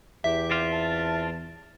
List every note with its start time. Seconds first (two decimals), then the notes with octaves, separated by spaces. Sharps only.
0.24 E2 G4 E5
0.51 C4 F4
0.73 A5